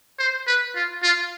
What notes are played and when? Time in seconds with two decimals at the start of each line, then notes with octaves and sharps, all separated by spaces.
0.19 C5
0.47 B4
0.76 F4
1.03 F4